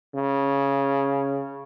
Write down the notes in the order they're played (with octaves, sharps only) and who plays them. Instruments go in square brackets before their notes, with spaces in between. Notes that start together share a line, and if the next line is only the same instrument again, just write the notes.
[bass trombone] C#3